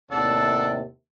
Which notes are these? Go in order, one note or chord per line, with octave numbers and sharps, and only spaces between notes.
D#2 A2 C3 D4 A4 D5 F#5